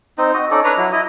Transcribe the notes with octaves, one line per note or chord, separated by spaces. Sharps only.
C4 D#4
F#4 D#5
C#4 D#4 A4 D5
D4 B4 C#5 A#5
F#3 E4
E4 D#5